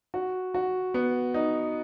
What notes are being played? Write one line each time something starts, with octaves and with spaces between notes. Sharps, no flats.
F#4
F#4
B3
D#4